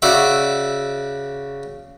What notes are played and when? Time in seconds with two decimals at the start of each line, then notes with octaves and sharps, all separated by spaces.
0.02 C#3 F#4 D5 E5